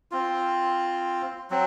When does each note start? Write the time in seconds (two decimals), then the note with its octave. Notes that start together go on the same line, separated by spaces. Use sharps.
0.12 C4 F4
1.50 F#3 C4